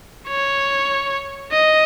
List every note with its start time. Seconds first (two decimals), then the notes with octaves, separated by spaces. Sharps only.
0.28 C#5
1.52 D#5